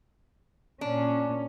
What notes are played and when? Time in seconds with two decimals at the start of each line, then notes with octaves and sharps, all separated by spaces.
0.81 A#2 C#4 D4